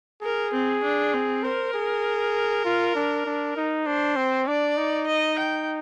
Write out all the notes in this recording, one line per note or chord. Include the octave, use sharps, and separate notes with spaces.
G#4 A#4
C4
D4
C4
A#4 C5
G#4
F4
D4
D4
D#4
D4 C5
C4
D4 D5
D#4
D#5
G5